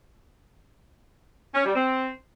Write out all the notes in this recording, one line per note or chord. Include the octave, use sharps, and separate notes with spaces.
C#4
G3
C4